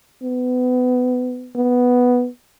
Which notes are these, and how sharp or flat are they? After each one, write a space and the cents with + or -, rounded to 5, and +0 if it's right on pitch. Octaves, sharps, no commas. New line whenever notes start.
B3 +25
B3 +0